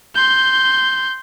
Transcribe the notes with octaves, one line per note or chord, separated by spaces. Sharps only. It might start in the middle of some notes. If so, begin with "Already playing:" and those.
C6 G6